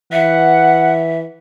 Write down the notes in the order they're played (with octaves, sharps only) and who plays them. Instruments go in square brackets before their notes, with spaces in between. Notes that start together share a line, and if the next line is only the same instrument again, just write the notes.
[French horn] E3 [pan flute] E5 [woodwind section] F#5